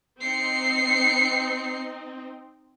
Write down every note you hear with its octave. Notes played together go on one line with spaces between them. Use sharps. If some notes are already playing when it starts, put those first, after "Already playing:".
C4 D#4 C7 C#7